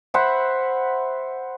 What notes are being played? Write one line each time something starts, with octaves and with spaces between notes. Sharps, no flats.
C5 E5 F#5 B5